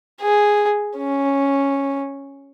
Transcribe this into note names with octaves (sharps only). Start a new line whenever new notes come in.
G#4
C#4